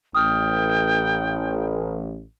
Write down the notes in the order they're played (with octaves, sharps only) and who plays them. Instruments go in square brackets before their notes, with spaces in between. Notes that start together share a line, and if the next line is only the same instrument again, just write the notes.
[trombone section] A1 [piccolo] G5 [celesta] D#6 F6